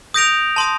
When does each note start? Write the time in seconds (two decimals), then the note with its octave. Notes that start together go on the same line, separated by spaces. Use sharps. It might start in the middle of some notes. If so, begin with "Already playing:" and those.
0.14 D#6 G6 A#6 D7 F7
0.56 A5 C6 D#6